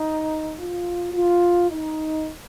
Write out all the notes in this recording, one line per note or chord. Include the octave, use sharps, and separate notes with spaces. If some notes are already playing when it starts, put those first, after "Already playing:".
Already playing: D#4
F4
F4
D#4